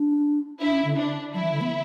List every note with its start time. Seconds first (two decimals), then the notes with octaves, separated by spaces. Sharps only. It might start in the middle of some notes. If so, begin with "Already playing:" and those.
Already playing: D4
0.61 D4 E4
0.72 C#4
0.85 D3
0.97 D4
1.34 F#3 E4
1.42 E3
1.52 D3
1.61 B3